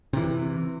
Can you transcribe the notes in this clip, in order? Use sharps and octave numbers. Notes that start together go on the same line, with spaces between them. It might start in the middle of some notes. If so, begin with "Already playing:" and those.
C3 E3